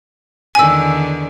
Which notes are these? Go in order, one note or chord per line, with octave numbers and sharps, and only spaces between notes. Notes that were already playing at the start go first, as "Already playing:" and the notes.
E2 D3 D#3 G#5 E6